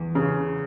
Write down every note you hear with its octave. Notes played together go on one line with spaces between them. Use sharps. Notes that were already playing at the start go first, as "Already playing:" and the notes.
Already playing: E2
C#3